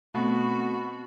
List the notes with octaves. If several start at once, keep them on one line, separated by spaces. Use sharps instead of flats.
B2 A3 B3 C4 F#4